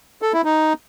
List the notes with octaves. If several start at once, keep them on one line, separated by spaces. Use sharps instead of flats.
A4
E4
D#4